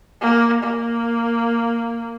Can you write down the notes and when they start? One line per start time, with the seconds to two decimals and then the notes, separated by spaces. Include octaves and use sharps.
0.21 A#3
0.63 A#3